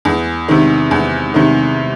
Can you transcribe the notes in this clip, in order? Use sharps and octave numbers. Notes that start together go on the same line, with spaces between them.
E2
C3 D#3
E2
C3 D#3